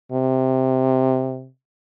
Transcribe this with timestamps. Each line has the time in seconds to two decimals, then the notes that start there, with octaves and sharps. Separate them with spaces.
0.12 C3